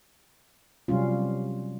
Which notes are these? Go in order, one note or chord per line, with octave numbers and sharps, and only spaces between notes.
C3 F#3 G3 C#4 F4